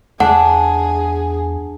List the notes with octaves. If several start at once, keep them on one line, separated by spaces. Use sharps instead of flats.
E2 D4 G#4 F#5